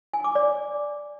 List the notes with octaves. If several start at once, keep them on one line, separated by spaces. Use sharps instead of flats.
G#5
D6
D5